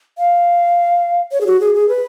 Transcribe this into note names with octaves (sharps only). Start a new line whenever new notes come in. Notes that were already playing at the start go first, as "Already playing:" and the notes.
F5
C#5
G#4
F#4
G#4
G#4
B4